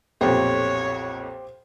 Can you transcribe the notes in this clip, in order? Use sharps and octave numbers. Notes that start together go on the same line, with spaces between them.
B1 F2 A#2 G4 C5 C#5